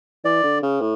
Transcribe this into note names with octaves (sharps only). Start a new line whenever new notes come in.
E3 D5
D3
C#3
A2